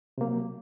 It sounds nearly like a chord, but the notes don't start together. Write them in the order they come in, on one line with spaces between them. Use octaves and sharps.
C3 A#3 F#3